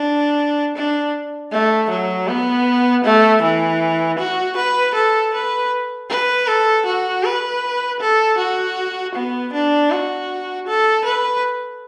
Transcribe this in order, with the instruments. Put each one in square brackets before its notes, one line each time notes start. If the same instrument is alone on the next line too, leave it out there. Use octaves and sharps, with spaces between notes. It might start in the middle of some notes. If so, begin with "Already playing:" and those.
Already playing: [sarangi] D4
D4
A3
F#3
B3
A3
E3
F#4
B4
A4
B4
B4
A4
F#4
B4
A4
F#4
B3
D4
F#4
A4
B4